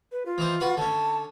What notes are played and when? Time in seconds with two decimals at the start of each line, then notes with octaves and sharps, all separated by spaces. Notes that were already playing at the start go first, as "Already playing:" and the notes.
0.12 B4
0.26 F4
0.38 E3 D#4 C5
0.60 F#4 B4 F#5
0.77 D3 C#4 A5